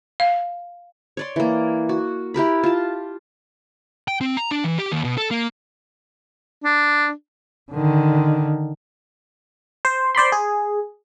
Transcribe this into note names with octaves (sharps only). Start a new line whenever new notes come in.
F5
C#5 D5 C6
E3 A#3
F#4
E4 G4 A#4 B5
F4 A5
G5
C4
A#5
D4
E3
G4
D#2
B2
A4
A#3
D4
D3 D#3
C5
C5 D5 B5 C6
G#4